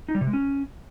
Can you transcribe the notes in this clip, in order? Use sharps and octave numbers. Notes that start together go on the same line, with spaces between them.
D#4
G3
C3
G#3
C#4